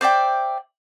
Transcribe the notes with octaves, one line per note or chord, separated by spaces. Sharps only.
C5 D5 E5 G5